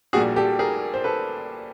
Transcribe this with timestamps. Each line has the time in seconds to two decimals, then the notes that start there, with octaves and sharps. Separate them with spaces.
0.13 A#1 A#2 G3 F#4 G#4
0.36 G4 A4
0.59 G#4 A#4
0.94 C5
1.04 A4 B4